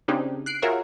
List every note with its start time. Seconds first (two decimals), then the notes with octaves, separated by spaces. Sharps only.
0.08 C#3 C4 D4 D#4 G4 G#4
0.46 F#6 C7 D7
0.62 F4 F#4 G#4 A#4 C#5 E5